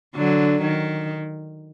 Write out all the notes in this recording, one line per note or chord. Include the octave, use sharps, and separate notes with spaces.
D3 F#3
D#3